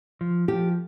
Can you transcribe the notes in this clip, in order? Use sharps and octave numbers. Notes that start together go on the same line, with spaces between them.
F3
F3 G4